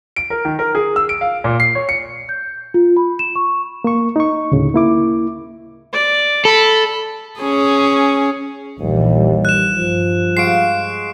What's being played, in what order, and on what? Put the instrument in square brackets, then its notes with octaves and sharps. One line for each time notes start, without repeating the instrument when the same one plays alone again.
[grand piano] D7
A#4
D#3
A#4
G#4
E6
D7
F5
A#2
C7
C#5
C#7
[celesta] G6
F4
B5
E7
C#6
[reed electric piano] A#3 C#6
D#4 C#6
D2 A2 C#3
A#3 E4 D6
[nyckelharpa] D5
[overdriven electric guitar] A4 [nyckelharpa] B5
[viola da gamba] C#4 G#4
[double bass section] A#1 E3 G3 [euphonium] D#2
[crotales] F#6 E7
[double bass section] G2 [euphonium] F3
[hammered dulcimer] G#3 F#4 F5 [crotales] C7 D7